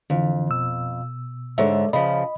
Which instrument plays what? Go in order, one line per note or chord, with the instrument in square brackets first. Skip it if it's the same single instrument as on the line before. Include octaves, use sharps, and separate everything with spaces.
[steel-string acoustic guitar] F2 [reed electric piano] D3 E3
[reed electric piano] B2 E6
[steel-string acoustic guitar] G#2 D3 [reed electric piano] G#3 C#5 E5
[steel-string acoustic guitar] C#3 F3 [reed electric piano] D#5 B5